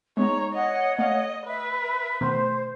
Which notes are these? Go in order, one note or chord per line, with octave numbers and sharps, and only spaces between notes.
G#3 B3 D#4 C#5 A#5
C#5 D#5 F#5
A3 D#5 F5
B4 E5
B2 D#3 A3 C5